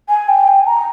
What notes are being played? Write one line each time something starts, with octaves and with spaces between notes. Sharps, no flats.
G#5
G5
G#5
A#5